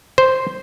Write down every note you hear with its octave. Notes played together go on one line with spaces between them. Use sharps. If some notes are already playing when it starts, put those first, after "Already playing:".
C5